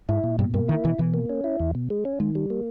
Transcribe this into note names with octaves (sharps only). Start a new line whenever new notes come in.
G#2 E4
A#2
G2 B2
G2 A#3
D#3 E4
B2 E3
B2 E3
A#3
C#4
E4
E2
B2
G#3
C#4
D#3 G#3
G3
A#3